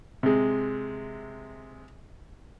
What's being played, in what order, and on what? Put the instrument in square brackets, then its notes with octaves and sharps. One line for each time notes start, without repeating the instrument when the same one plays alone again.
[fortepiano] C3 G#3